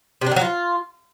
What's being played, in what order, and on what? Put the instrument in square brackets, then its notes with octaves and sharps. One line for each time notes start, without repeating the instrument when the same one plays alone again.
[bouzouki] C3
D4
D#3
F#3
F4